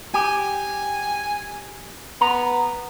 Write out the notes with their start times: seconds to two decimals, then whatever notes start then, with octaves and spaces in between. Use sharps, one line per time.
0.14 G4 G#5
2.21 B3 A#5